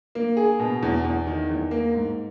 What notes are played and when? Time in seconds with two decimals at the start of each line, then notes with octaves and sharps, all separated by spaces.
0.15 A#3
0.37 G#4
0.59 B2
0.83 E2
1.05 E2
1.27 D#3
1.50 E2
1.71 A#3
1.94 G#2